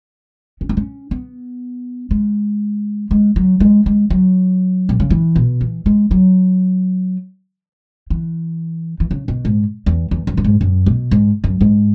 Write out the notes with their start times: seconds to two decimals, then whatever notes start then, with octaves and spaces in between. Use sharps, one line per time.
0.61 C#4
0.69 B3
0.77 C#4
1.11 B3
2.11 G#3
3.11 G#3
3.36 F#3
3.60 G#3
3.86 G#3
4.10 F#3
4.89 B2
5.00 C#3
5.10 E3
5.36 B2
5.61 E3
5.86 G#3
6.11 F#3
8.10 E3
9.00 E3
9.11 C#3
9.28 B2
9.45 G#2
9.86 E2
10.11 E2
10.27 F#2
10.37 F#2
10.44 G#2
10.61 F#2
10.86 B2
11.11 G#2
11.44 F#2
11.61 G#2